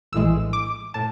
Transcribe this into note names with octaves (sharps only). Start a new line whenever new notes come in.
A#1 A2 E3 G#3 E6
D6
A2 A5